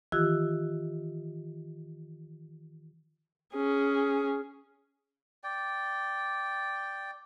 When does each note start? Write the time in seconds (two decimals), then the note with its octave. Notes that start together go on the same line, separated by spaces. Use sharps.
0.12 D#3 E3 F4 G4 E6 F#6
3.54 C#4 G#4
5.44 D5 G5